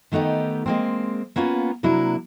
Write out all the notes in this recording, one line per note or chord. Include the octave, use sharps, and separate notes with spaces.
D#3 A3 B3 D#4 G4
G#3 A#3 C4
A#3 B3 C#4 F4
C3 F#3 A#3 D4 E4